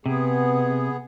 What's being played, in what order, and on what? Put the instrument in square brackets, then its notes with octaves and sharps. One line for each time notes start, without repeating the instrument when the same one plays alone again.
[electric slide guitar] C3 [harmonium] B3 G#4